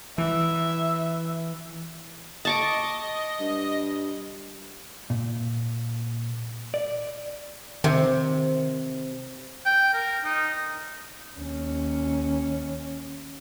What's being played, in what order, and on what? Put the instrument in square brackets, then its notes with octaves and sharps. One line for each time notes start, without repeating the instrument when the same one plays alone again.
[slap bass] E3 [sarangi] E5
[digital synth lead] D#5 [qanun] A5 C#6 D6
[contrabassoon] G2
[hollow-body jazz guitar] A#2
D5
[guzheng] C3 [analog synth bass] D#3
[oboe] G5
A#4
D#4
[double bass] D#2 C#4